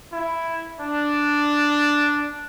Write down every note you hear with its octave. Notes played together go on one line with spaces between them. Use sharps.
E4
D4